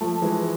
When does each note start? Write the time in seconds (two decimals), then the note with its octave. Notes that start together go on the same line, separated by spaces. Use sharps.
0.01 F3 A3
0.22 E3 G#3